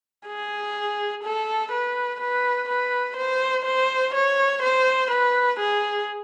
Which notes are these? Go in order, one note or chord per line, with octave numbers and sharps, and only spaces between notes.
G#4
A4
B4
B4
B4
C5
C5
C#5
C5
B4
G#4